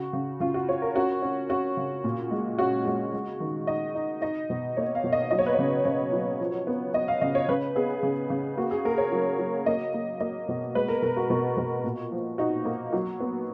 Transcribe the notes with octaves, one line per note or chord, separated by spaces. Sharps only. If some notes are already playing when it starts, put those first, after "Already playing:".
Already playing: C#3 F#4
C#3
C#3 F4
F#4
C#4 C#5
A#4
C#4 F#4
C#4
C#4 F#4
C#3
A#2
G#3
C#4 F#4
G#3 F#4
G#3
D#3
D#4 D#5
D#4
D#4 D#5
B2
A#3 C#5
F5
B2
D#5
F#3 D#5
C#5
B4
C#3 C#5
C#3 C#5
F#3
F3
B3
B3 D#5
F5
C#3 D#5
C#5
C#3 B4
B3 G#4
C#3
C#3
A#3 F#4
G#4
A#3 A#4
C#5
F#3
F#3
A#3 D#5
A#3
A#3 D#5
B2
G#3 B4
A#4
B2 A#4
F#4
B2
B2
A#2
F3
D#4 F#4
A#3
F#3
B3